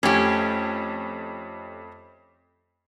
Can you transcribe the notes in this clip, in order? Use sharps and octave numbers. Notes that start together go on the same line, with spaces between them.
F2 A3 C#4 G4